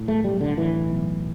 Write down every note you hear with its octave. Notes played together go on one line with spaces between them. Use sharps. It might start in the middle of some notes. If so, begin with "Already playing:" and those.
Already playing: A2
A3
B1 G3
D3
A2 E3
B1